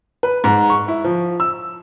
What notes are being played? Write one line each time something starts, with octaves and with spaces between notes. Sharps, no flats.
B4
G#2
C#6
E4
F3
E6